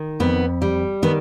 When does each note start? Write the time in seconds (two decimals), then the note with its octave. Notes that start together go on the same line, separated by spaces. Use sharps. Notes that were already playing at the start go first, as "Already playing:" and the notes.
Already playing: D#3
0.20 F2 B3
0.62 G3
1.02 D#3 B3